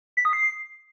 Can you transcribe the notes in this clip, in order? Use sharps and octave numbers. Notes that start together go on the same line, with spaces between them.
B6
D#6
C7